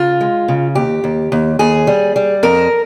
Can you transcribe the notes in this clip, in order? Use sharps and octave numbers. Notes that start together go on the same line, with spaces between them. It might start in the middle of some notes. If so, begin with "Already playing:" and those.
Already playing: C#3 F4
G#3
C#3
D#2 G4
D#2
D#2
D#2 G#4
G3
G3
F2 A#4